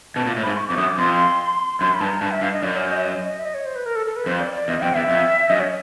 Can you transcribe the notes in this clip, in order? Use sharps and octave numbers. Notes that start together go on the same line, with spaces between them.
B2 A5
A#2
A2
G#2 B5
C#6
F2 D6
F#2 D#6
D6
F2 C6
F#2 C6
B5
G2 A5
A#5
G2 A5
E5
G2 F5
D#5
F#2 D5
C#5
D#5
E5
D#5
D#5
E5
D#5
C#5
C5
B4
A#4
A4
A4
B4
F2 C5
D5
D5
E2 D#5
F2 G5
E2 E5
F2
F#2 D#5
C#5